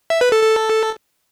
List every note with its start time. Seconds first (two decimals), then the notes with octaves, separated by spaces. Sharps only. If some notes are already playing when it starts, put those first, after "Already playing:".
0.10 E5
0.21 B4
0.32 A4
0.43 A4